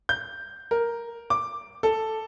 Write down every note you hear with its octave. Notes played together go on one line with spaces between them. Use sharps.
G6
A#4
D6
A4